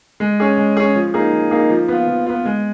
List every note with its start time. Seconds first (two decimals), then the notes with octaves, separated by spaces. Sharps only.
0.20 G#3
0.40 C#4 G#4
0.58 G#3
0.77 C#4 G#4
0.95 F3
1.14 A#3 D#4 G#4
1.33 F3
1.51 A#3 D#4 G#4
1.70 F3
1.88 B3 F4
2.08 F3
2.26 B3 F4
2.45 G#3